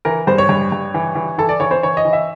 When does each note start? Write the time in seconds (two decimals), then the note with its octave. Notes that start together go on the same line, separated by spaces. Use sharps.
0.05 E3 A#4
0.27 G2 C5
0.38 C#5
0.49 G2
0.72 G2
0.94 E3
1.15 E3
1.38 E3 A4
1.49 D5
1.60 E3 C#5
1.71 C5
1.83 E3 C#5
1.97 D#5
2.05 E3
2.13 E5